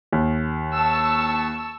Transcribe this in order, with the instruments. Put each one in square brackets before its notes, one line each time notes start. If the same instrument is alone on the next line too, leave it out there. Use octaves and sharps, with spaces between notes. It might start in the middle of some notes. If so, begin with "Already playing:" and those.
[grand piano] D#2
[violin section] A5 C#6 E6